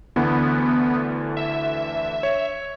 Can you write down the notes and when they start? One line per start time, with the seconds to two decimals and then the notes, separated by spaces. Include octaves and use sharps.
0.16 D2 D3 E3 B3
1.37 E5
2.23 C#5